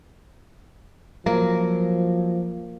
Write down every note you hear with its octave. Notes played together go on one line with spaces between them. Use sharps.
F3 F#3 A#3